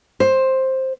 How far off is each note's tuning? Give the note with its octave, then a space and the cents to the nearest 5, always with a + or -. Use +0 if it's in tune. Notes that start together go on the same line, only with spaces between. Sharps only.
C5 +10